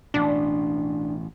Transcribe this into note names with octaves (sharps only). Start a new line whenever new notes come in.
A1 B2 D4